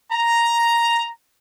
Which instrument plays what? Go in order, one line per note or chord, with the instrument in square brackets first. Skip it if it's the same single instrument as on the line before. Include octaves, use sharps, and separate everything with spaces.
[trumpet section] A#5